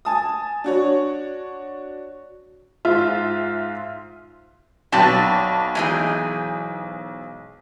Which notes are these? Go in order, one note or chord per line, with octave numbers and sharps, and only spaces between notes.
G#5 A5 D#6
D4 F#4 C#5
G#2 F4 E5
B1 C4 F#4 B4 D5 A5 A6 B6
G#2 E3 G#4 G5 G#5